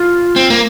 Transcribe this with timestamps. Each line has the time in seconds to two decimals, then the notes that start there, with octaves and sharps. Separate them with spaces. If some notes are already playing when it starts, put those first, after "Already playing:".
Already playing: F4
0.36 C4
0.50 A#3